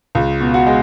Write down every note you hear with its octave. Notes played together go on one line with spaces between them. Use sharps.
C#2
B2
F#4
G#3